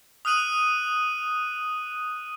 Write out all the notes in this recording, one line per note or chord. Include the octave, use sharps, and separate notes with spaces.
D#6 F6 F#6 D#7 F#7